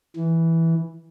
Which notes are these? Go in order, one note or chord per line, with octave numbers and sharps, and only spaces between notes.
E3